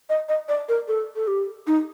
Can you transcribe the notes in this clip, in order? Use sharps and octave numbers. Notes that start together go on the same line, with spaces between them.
D#5
D#5
D5
A#4
A4
A4
G4
D#4